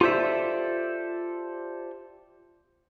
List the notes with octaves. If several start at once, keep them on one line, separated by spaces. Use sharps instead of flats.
F4 G4 A4 C5 D5 E5